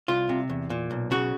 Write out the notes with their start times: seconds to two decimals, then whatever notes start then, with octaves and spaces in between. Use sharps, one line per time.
0.08 C2 F4
0.29 C3
0.50 E2
0.70 A#2
0.91 B1
1.11 C#3 F#4